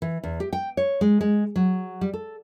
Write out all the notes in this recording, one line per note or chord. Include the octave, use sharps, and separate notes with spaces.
E3
E2
G4
G5
C#5
G#3
G#3
F#3
G3
A4